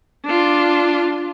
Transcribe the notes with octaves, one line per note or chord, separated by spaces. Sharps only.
D4 F4